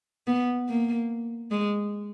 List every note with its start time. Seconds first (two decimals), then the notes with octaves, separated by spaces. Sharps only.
0.27 B3
0.69 A#3
1.51 G#3